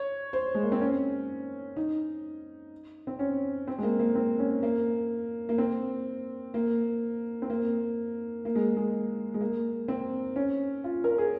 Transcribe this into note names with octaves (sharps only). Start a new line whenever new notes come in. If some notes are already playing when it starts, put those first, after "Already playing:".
Already playing: C#5
C5
G#3
A#3
C4
C#4
D#4
C4
C#4
C4
G#3
A#3
A#3
C4
C#4
A#3
A#3
C4
A#3
C4
A#3
A#3
G#3
G#3
G#3
A#3
C4
C#4
F4
A#4
G#4